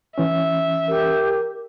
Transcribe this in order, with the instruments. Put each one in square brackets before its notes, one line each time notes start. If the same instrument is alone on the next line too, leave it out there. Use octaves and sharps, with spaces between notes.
[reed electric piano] E3 C#4 [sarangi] E5
[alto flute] G4 [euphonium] A#4